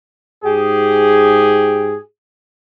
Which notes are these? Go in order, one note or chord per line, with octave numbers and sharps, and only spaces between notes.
G#2 G4 G#4